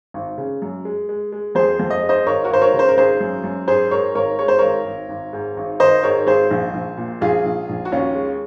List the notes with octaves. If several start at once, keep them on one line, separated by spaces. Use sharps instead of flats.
G#1
C#3
F#2
G#3
G#3
G#3
F2 G#4 C5
F2
D#5
G#3
C5 D#5
G#1 A#4 C#5
F#4 A#4
G#1 C5
A#4 C#5
C#3
C5
A#4
G#1 G#4 C5
F#2
F#2
G#2 G#4 C5
G#2 A#4 C#5
G#1 A#4 C#5
G#3 C#5
C5
G#1 A#4 C#5
G#1
G#1
G#2
G#1
D#3 C5 D#5
G#2 A#4 C#5
G#1 G#4 C5
A#1
A#1
A#2
A#1 F4 G#4
A#1
A#1
F#4
D#2 C#4 F4
G#3